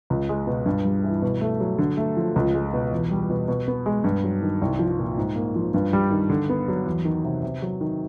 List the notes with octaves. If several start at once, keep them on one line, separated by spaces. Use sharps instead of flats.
C#2
G#3
B2
G2
G3
E3
B2
A3
F#3
D3
A3
F3
C#2
G#3
B2
E2
G3
B2
B2
B3
G#3
G2
F#3
D#3
C2
F3
A#2
G#2
A#3
F3
G2
G3
D#3
D3
B3
F#3
E2
D#3
C3
C3
F#3
D#3